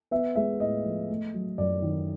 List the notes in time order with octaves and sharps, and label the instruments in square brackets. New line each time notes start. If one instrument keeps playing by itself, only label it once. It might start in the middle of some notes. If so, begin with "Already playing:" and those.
[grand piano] B3 E5
G#3 E5
A2 D#5
F3
A3
F#3
F#2 D5
D#3